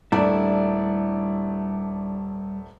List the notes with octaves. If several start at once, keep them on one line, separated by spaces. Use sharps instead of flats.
D#1 G3 A3 D4 E4 A4 D5 E5